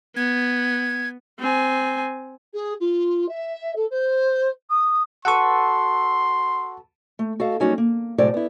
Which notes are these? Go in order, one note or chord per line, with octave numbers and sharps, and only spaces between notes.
B3 G#6
C4 G#5
G#4
F4
E5
A4
C5
D#6
F#4 A4 B4 F#5 C6 C#6
A3
F#4 A4 D#5 F5
F#3 G3 A#3 C#4 D#4 F#4
A#3
A2 C3 F#3 G#3 C5 D5
B3 E4